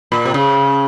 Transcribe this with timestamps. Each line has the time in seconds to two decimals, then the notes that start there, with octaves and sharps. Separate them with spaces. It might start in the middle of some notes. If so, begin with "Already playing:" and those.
0.12 A#2
0.25 C3
0.34 C#3